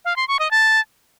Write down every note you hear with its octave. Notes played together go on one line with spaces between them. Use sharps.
F5
C6
C#6
D#5
A5